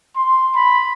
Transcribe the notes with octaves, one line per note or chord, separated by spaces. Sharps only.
C6
B5